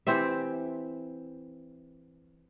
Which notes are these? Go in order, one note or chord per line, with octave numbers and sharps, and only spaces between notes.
E3 C4 G4 E5